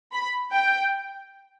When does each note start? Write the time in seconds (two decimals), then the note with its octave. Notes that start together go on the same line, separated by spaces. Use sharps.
0.12 B5
0.52 G5